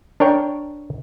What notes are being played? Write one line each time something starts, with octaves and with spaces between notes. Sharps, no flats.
D4 A#4 C#5 G5